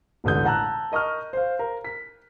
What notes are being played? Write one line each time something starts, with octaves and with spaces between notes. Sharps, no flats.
E1 A1 D3 D#6 G6
F#5 A5 A#5 E6 F#6
A#4 D#5 C#6 D#6 F6
C5 F5
A#4
B6